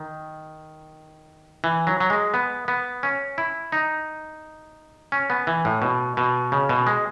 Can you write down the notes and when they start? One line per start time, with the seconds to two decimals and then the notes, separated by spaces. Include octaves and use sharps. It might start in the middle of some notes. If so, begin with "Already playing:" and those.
Already playing: D#3
1.64 E3
1.87 F#3
2.00 F#3
2.10 G#3
2.34 B3
2.68 B3
3.03 C#4
3.38 E4
3.72 D#4
5.12 C#4
5.30 B3
5.47 E3
5.65 A2
5.82 B2
6.17 B2
6.52 C#3
6.69 B2
6.87 G#3